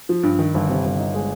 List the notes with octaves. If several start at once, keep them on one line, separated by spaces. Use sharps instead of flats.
F3
G2
D#3
G1
C3
G1
D#4
G#3